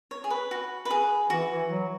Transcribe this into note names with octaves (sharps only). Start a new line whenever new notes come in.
C#5
G#4
B4
F#4
B4
G#4
E3 F#4
E3
F#3